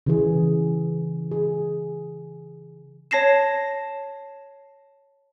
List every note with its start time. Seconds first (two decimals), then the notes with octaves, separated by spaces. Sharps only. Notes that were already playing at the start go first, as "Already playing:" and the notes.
0.06 C#3 E3 G#4
1.31 G#4
3.11 C#5 A5 A#6 C7 E7